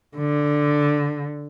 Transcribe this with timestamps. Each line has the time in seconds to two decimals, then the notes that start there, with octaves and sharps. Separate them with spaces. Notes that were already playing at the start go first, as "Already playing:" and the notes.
0.17 D3